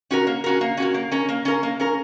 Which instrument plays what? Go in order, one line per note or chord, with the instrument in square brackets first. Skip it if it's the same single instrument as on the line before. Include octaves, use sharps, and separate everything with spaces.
[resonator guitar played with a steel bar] C#4 F#4 A#4
A#3
C#4 F#4 A#4
A#3
C#4 F#4 A#4
A#3
C#4 A#4
A#3
C#4 A#4
A#3
C#4 A#4